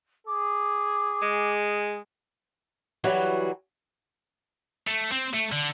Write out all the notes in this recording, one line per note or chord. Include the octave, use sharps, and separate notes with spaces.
G#4 D6
G#3
E3 F#3 G3 F#4
A3
C4
A3
D3